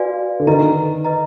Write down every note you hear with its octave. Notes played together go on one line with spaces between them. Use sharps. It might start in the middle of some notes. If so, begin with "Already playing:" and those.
Already playing: F#4 B4 D5 F5 G#5
D3
D#3 B4 D#5 A#5
B4 D#5 A#5